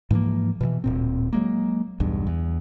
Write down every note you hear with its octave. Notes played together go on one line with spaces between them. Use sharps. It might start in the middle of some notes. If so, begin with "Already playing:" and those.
G#2 E3 F3 A#3
B2 D#3 E3
D1 A#2 C4
F#3 G#3 A#3
B1 E2 G2
E2